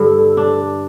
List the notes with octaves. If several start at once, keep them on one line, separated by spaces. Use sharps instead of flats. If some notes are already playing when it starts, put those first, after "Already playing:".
Already playing: G2 D3 A4
D4